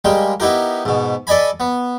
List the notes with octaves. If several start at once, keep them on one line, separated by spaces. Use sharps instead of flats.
G3 G#3 A#3 G4
B3 D#4 E4 G4 A#4
G#2 B2
A4 D5 D#5 G#5 B5
B3